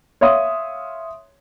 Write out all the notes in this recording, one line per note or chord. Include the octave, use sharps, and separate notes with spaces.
C#5 E5 F5 C6 D#6